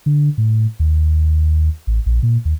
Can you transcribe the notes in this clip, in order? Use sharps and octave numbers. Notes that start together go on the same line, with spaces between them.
D3
A2
D#2
A1
A#1
A#2
D#2